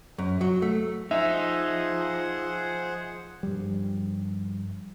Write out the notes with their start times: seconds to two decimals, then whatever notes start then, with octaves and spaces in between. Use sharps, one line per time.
0.18 F#2
0.41 F#3
0.62 A3
1.11 F3 D#4 G#4 C5 E5 F#5
3.43 G2 F3 G3